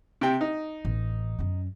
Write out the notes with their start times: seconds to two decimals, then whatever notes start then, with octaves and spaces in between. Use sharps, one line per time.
0.21 C3 G5
0.41 D#4
0.85 A1
1.39 F#2 C#4